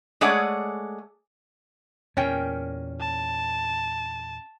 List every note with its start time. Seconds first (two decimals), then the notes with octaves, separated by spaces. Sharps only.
0.21 G#3 A3 G#4 C#5 D5 F#5
2.17 E2 A#2 C#4 A#4 G5
3.00 A5